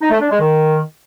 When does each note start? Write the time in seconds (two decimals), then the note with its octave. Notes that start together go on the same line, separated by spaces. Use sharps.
0.01 D#4
0.11 A3
0.21 D4
0.30 G#3
0.40 D#3